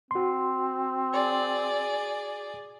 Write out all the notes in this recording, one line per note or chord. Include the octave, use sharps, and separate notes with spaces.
C4 F#4 C6
G#4 D5